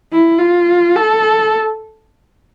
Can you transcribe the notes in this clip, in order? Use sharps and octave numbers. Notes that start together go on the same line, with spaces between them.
E4
F4
A4